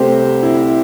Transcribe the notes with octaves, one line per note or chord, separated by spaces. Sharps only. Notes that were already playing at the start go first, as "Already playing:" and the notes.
Already playing: C2 C3 A3 C4 G4 C5
E4